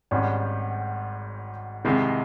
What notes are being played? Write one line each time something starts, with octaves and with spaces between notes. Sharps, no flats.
G#1 G#2 G3 C#4
C2 C3 D#3 G#3